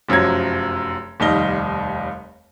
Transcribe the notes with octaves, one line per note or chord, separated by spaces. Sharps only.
F1 F#2 F3 F#3 G#6
F1 D#2 G3 D#5 G7